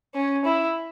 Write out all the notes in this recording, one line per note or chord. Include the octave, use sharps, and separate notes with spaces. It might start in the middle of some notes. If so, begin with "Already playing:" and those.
C#4
E4